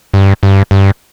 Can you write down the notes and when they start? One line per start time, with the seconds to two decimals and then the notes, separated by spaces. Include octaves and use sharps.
0.14 G2
0.43 G2
0.71 G2